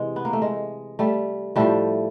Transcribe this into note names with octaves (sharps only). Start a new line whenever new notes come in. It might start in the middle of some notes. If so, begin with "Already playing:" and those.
Already playing: C3 E3 G#3
B3
A#3
A3
G#3
G3 A3
A2 F3 G3 A3